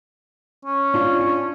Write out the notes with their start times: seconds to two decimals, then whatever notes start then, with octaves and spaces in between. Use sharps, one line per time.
0.65 C#4
0.94 D4 F4